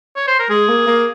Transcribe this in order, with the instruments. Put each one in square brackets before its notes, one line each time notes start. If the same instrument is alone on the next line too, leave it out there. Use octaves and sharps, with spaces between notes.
[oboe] C#5
C5
A#4
[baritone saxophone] G#3 [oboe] G#4
[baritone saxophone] A#3
A#3